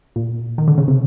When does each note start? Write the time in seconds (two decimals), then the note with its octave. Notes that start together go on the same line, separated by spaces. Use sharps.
0.16 A#2
0.58 D#3
0.68 D3
0.78 C#3
0.88 C3